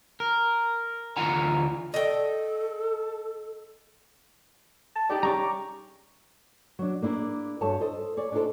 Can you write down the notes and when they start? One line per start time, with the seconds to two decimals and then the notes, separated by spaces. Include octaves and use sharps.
0.20 A#4
1.17 D2 E3 F4 F#5 G#5 A#5
1.94 A4 D#5 G5
4.96 A5
5.10 D#4 G4 G#4 D5
5.23 G3 C#4 A#5 C#6 D6
6.79 F#3 D4
7.02 A#3 D4 E4 G#4 A#4
7.61 G2 F#4 A4 C#5 A5
7.81 A4 C5 D#5
8.17 G#4 C#5 D5
8.32 D4 D#4 F4 G4 A4 C5